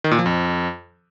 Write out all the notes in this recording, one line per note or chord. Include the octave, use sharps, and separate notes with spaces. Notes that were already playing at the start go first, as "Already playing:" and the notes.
D#3
A#2
F3
F2